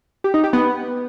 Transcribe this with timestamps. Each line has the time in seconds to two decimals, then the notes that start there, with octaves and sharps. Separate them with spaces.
0.24 G4
0.34 D#4
0.44 G4
0.53 B3